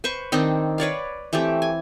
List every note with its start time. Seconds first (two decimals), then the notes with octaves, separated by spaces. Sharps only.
0.04 B4 C5 C#6
0.32 D#3 C4 D4 D#4
0.78 B4 C#5 D5 F5
1.33 E3 A3 C4 G4
1.62 G#5